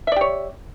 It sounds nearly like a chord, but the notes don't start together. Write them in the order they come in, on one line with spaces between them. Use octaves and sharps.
E5 D5 G4 C#5